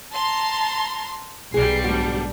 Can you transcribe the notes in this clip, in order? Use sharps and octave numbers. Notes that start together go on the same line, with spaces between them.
A5 A#5 C6
B1 G3 G#4 C7
D2 G#2 D4 F#4